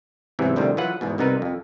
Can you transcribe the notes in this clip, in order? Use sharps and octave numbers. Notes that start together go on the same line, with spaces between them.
E2 G#2 C3 E3 F#3
D2 A2 C3 D#3 G3
E3 F#3 F4 B4 F#5
E2 G#2 B2
C2 C3 B3 D#4 A#4 B4
F2